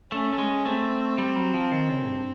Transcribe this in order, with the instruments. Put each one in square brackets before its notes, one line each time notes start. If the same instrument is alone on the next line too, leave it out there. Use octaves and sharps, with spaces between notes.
[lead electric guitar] A3 [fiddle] C#4
[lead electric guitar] A3
G#3
[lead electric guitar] A3 [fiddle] C4
[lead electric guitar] G3
F#3
F3
D#3
C#3
G2